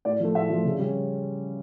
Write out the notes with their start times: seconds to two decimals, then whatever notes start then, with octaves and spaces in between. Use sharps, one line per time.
0.05 A2 D5
0.20 F3 A3
0.34 A2 E5
0.50 F3 A3
0.65 C#3
0.79 G3 C#4